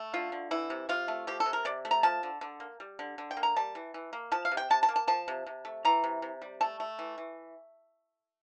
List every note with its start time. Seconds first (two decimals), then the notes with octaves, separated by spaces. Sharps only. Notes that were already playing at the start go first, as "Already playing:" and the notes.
Already playing: A3
0.13 D3 F4
0.32 D3
0.51 E3 E4
0.70 C3
0.89 C3 F4
1.08 A3
1.27 F3 G4
1.40 A4
1.46 C3
1.53 A#4
1.65 C3 D5
1.85 A3
1.91 A#5
2.03 F3 A5
2.23 D3
2.41 D3
2.60 A#3
2.80 G3
2.99 D3
3.18 D3
3.31 G5
3.37 A#3
3.43 A#5
3.56 G3 A5
3.75 E3
3.94 E3
4.13 A#3
4.32 F3 A5
4.45 F5
4.52 C3
4.57 G5
4.70 C3 A5
4.83 A5
4.89 A#3
4.96 A5
5.07 F3 A5
5.28 C3
5.46 C3
5.65 A3
5.85 E3 A#5
6.04 C3
6.22 C3
6.42 G3
6.61 A3 A5
6.80 A3
6.99 E3
7.18 E3